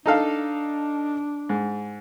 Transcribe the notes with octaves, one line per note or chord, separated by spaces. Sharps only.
D4 D#4 A4 F5
G#2